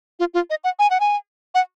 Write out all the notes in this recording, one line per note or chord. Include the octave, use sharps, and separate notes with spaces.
F4
F4
D#5
F#5
G#5
F#5
G#5
F#5